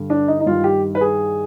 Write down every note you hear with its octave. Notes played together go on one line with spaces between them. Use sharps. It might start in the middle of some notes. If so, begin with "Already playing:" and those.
Already playing: G2 D3
D4
D#4
D#4
G2 D#3 F4
G4
B4
G#4